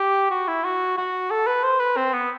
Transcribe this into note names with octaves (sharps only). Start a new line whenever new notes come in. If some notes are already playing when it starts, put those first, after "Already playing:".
Already playing: G4
F#4
E4
F#4
F#4
A4
B4
C5
B4
C4
B3